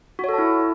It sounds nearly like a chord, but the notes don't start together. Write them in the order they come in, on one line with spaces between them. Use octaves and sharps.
F#4 C#5 A4 A5 E4